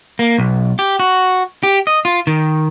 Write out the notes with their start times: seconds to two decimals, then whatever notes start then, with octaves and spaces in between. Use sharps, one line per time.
0.19 A#3
0.38 B1
0.79 G4
1.00 F#4
1.63 G4
1.87 D#5
2.05 F4
2.27 D#3